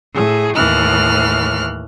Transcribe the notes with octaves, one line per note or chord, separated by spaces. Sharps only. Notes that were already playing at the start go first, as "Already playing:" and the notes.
A2 G#4
D#2 A2 E3 F6 F#6